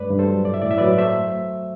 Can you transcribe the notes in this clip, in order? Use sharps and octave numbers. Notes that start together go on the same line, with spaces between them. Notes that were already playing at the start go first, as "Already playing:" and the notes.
Already playing: G2 A3 B4 D5
G2
A4 C5
F#3
A2 D5
E5
A2 D5
E5
F#3 B4 D5
A3 C5 E5